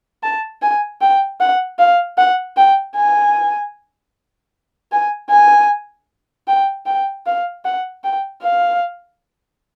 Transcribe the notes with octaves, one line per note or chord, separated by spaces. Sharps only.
A5
G#5
G5
F#5
F5
F#5
G5
G#5
G#5
G#5
G5
G5
F5
F#5
G5
F5